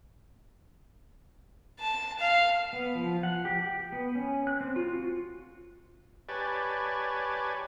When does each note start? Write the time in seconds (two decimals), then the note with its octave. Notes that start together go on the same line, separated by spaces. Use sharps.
1.79 A5
2.19 F5
2.73 B3
2.95 F3
3.23 F#5
3.45 G4
3.60 G5
3.92 B3
4.15 C#4
4.47 F#6
4.61 C4
4.76 F4
4.94 F#4
6.29 G4 B4 C#5 D5 G#5 A5